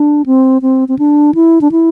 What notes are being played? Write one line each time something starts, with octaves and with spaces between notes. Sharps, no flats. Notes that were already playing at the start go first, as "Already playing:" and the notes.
Already playing: D4
C4
C4
C4
D4
E4
D4
E4